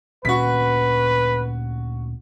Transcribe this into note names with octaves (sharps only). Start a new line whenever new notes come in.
D2 A#2 C#4 F#4 B4 B6